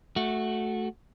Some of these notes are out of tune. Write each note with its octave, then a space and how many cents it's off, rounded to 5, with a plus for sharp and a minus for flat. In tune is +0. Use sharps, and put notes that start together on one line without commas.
A3 -10 F#4 +0